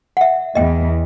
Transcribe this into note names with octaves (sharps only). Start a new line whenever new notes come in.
E5 F#5
E2 D#5 G5